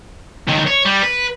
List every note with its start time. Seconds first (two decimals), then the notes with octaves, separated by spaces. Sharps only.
0.48 C#2 D#3
0.68 C#5
0.86 G3
1.03 B4